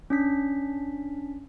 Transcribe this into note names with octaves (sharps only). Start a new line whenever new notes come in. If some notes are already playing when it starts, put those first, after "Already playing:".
C#4 D4 B6